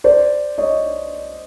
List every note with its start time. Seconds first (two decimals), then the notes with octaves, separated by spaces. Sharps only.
0.04 C5 D5
0.58 C#5 D#5